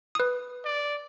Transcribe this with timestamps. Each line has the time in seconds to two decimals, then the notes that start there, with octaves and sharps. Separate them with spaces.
0.15 B4 D#6
0.65 D5